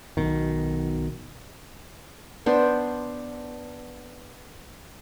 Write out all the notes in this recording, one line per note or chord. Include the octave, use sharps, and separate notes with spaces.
B1 B2 D#3
B3 D4 C5